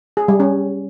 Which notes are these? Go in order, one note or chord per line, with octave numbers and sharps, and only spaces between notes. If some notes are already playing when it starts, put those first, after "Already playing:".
G#4
G3
C#4